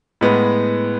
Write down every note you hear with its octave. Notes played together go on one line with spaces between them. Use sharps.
A2 G#3 B3